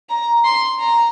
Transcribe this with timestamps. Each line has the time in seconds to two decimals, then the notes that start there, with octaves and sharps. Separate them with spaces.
0.09 A#5
0.44 C6
0.80 A#5